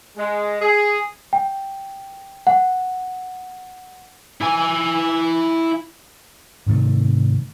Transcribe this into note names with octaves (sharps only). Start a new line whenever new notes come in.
G#3
G#4
G5
F#5
E4 G#5
G#2 C3 D#3 A3